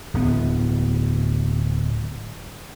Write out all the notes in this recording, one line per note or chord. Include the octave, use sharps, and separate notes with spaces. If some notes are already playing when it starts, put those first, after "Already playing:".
D1 B3